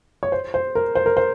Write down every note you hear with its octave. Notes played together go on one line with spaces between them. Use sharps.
C#5
C5
C5
A#4
C5
A#4
C5